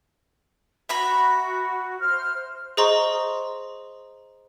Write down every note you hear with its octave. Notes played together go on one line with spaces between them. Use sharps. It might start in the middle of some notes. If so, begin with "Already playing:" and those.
F#4 E5 A#5 B5
C5 F6
G#4 C5 D#5 A#5 C6 C#6